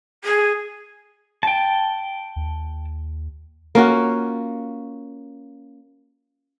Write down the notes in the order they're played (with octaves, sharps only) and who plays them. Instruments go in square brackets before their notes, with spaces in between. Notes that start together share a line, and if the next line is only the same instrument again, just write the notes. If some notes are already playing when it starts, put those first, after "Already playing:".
[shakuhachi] G#4
[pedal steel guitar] G5 A5
[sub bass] D#2
[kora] A#3 C#4 F4 F#4